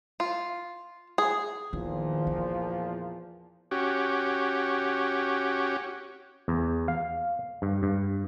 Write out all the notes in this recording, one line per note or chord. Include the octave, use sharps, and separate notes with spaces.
F4
G#4
E2 A#2 D#3 F3
B3
C#4 F#4 G4
E2
F5
G2
G2